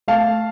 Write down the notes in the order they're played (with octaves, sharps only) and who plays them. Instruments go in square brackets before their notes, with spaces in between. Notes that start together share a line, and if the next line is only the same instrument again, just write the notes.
[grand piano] A3 F5 A5